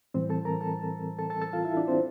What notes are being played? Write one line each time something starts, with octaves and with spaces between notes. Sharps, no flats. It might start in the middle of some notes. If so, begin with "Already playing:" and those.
A2 E3 G3 C4 C5
A4 A5
A#4 A#5
A4 A5
A4 A5
A4 A5
A4 A5
F4 F5
E4 E5
D4 D5
C4 C5